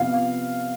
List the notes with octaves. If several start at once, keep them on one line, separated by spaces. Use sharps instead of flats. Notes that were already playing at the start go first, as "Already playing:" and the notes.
Already playing: C3 F3 B3 F5